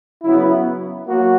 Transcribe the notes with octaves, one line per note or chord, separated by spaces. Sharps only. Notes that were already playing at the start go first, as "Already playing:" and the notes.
C#3 F#3 B3 E4
F#3 A#3 F#4